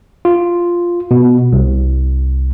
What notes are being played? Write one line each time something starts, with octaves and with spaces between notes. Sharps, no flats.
F4
B2
C2